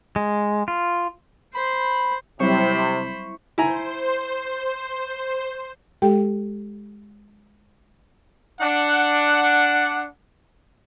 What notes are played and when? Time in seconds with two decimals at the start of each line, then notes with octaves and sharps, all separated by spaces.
0.16 G#3
0.68 F4
1.55 C5 B5
2.40 C3 F#3 G3 C4 E4 C5 B5 C#6
3.58 E4 C5 G#5 A#5
6.02 G#3 G4 A4 G5
8.61 D4 F#5